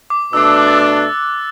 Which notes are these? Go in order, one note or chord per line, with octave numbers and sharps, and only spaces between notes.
D6
B2 A3 D4 E6
E6
F#6
A6
E6